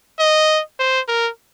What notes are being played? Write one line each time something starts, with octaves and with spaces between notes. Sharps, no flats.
D#5
C5
A#4